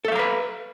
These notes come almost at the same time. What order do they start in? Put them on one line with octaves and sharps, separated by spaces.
A4 E5 F5 A#5 B4